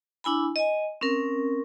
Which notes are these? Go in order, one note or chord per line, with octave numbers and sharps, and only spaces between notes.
D4 E4 G#5 B5
D#5 G#5
C4 C#4 A#4